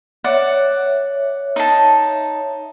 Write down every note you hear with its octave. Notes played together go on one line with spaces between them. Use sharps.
C#5 D5 E5 F#5
D#4 A5